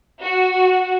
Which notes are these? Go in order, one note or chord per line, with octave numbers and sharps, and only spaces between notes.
F#4